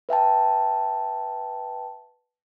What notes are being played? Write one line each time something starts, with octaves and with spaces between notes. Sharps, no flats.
B4 E5 G5 A5